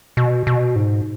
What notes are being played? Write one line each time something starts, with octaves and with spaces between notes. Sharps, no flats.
B2
B2
G#2